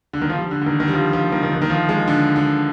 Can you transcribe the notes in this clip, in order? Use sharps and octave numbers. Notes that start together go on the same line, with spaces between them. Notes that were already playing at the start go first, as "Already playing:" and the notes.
D3
D#3
F3
G3
D3
D3
D#3
D#3
G3
F3
F3
D#3
D#3
D3
D#3
F3
G#3
D3
D3